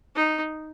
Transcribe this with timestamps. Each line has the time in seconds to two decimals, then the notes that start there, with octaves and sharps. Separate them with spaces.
0.15 D#4